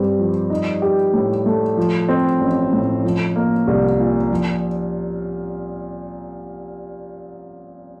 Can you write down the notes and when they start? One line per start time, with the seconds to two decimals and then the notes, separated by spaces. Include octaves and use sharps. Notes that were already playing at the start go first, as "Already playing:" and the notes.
Already playing: G2 C4 G4
0.19 F3
0.50 D#4
0.82 G4
1.14 A2
1.46 A3
1.77 F3
2.09 C4
2.41 A1
2.73 A2
3.04 F3
3.36 A#3
3.67 C2
3.99 A#2
4.31 F3